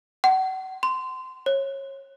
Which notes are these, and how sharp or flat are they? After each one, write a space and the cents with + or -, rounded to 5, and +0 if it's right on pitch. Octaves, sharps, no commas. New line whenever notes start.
F#5 +35
C6 -20
C#5 -25